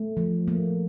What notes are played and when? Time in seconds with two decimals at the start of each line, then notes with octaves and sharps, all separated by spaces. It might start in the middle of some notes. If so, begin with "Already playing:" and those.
Already playing: A3
0.17 F3
0.48 A#3